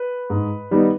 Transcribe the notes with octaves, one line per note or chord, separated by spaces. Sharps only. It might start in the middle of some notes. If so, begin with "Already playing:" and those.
Already playing: B4
G#2
D#3 G3 B3 D#4